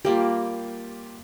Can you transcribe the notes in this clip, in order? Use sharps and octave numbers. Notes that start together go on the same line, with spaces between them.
G3 A#3 F4 G4